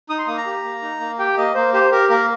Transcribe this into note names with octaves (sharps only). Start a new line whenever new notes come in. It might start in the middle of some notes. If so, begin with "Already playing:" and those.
D#4 D#6
C6
A#3 D#6
A#5
G4
A#3
D#4
A#3
G4 G5
A#3 D#5
A#3 C5
G4 C5
G4 A#4
A#3 A#4